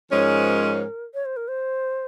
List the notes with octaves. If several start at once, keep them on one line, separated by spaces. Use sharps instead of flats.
G#2 F3 G#3 C#4 A#4
C#5
C5
A#4
C5